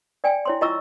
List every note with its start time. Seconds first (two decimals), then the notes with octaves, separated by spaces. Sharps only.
0.24 D5 G5 G#5
0.45 E4 C#5 C6
0.61 E4 F4 D#5 A#5 C#6 E6